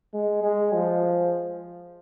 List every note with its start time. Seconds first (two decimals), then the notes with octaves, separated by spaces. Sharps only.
0.13 G#3
0.43 G#3
0.73 F3